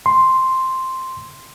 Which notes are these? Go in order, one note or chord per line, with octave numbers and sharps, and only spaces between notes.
C6